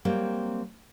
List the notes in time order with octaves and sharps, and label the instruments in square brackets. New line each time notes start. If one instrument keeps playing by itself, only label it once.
[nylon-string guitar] F#3 G3 A#3 C4